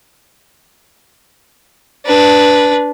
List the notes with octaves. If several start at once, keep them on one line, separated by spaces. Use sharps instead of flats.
D4 B4